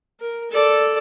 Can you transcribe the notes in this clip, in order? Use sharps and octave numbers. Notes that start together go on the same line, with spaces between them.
A#4
A4 D5